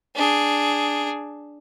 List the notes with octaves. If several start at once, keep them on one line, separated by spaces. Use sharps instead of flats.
D4 G#4